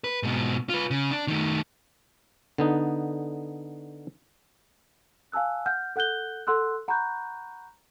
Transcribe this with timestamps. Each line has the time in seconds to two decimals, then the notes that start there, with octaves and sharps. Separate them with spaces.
0.04 B4
0.23 G#2 B2
0.69 F4 B4
0.91 C#3
1.11 D4
1.28 D#3 A3
2.58 D3 B3 D#4
5.32 F5 G#5 A5 E6 F#6
5.66 F#5 F6 G6
5.96 A4 F#5 F#6 G6 G7
6.47 A4 F#5 C6 E6 F#6
6.88 F#5 A#5 B5 C#6 F#6 G6